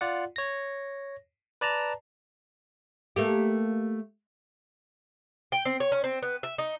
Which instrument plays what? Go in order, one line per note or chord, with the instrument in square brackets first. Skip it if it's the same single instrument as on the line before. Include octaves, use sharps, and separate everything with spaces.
[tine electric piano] F4 D5 F#5
C#5 A#6
B4 D5 A5 A#5
[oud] A3 A#3 G4
[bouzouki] G5
C4
C#5
C#4
C4
B3
E5
D#4